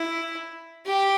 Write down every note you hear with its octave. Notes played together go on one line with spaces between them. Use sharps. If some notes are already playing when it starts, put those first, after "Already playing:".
Already playing: E4
G4